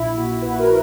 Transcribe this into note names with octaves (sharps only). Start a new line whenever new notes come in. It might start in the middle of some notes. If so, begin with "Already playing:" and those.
Already playing: A#1 E4
A#2 F#4
A#1 B4
A#4
A#2